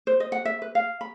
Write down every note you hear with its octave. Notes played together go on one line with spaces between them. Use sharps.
C5
D#5
F#5
E5
B4
F5
B5